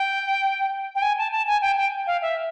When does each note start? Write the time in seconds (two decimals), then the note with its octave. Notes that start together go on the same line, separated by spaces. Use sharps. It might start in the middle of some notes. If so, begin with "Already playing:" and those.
Already playing: G5
0.95 G5
1.02 G#5
1.18 A5
1.32 A5
1.47 G#5
1.62 G5
1.77 G5
2.07 F5
2.22 E5